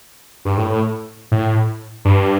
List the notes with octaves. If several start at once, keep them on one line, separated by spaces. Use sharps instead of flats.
G2
A2
A2
G2